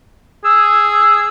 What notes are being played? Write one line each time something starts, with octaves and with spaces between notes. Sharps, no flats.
G#4 E6